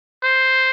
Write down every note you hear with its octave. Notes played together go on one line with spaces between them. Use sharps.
C5